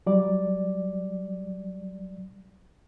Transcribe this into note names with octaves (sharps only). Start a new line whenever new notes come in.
F#3 G3 D5